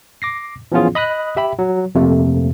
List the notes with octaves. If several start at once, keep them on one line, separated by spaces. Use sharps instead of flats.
D6 A#6 C7
E3 F3 B3 C#4 F4 G#4
D#5 B5 D#6 F#6
G4 E5 G5 B5
F#3
F2 C3 A3 A#3